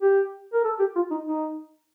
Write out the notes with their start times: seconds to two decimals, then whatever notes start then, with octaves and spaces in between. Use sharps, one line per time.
0.02 G4
0.53 A#4
0.64 A4
0.79 G4
0.95 F4
1.10 D#4
1.25 D#4